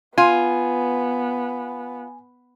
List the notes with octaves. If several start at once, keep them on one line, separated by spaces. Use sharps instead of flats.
B3 F4 G#5